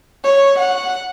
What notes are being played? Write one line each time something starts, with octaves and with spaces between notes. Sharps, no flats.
C#5
F#5